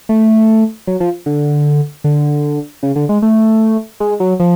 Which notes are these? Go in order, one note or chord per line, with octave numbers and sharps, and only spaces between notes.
A3
F#3
F3
D3
D3
C#3
D3
G#3
A3
G#3
F#3
F3